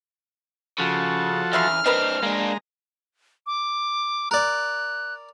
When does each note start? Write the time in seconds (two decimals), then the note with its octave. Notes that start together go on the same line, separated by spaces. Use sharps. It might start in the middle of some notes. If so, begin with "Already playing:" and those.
0.79 C#3 F3 F#4 A4
1.53 E2 C#3 E5 C6 F6
1.86 C4 D4 A#4 B4 D#5
2.23 G#3 A#3 D4 A#5
3.47 D6
4.31 A#4 D5 F#6